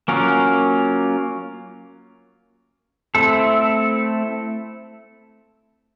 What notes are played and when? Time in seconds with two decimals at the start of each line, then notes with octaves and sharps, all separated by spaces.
0.08 F#3 A#3 C#4 F4 A#4
3.15 A3 C4 E4 A4